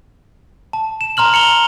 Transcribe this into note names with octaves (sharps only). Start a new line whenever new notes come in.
A5
E7
A#5 C6 F6 F#7
C#7 F7 G7